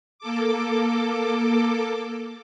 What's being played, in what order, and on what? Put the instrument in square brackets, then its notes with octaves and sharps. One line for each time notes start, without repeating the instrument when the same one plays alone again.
[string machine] A#3 A4 D6